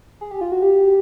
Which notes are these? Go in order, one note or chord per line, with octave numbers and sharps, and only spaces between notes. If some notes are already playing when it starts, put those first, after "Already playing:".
G#4
G4
F4
F#4
G4